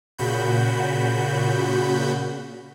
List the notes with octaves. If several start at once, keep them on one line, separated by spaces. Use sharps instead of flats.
A#2 C#3 F#4 B5 G6